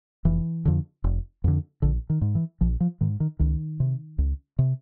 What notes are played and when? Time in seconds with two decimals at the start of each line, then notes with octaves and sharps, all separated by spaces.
0.25 F1 E3
0.65 F2 D3
1.04 F1
1.44 F2 D3
1.82 A#1 D3
2.10 D#3
2.21 G#2
2.35 E3
2.61 A#1 F3
2.80 F3
3.01 G#2 D#3
3.20 D#3
3.39 C#2 D#3
3.80 C3
4.18 C#2
4.59 C3